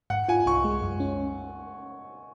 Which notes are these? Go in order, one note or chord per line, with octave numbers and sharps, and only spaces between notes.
G#2 F#5
F4 G#5
C2 C#6
G#3
F#2
C#4